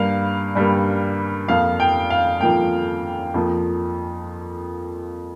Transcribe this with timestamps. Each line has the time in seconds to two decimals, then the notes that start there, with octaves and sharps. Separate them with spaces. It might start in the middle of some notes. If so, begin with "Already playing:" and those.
Already playing: G2 G3 A#3 F5
0.55 G2 G3 A#3
1.48 F2 F3 A#3 F5
1.80 G5
2.10 F5
2.41 F2 F3 A#3 G5
3.34 F2 F3 A#3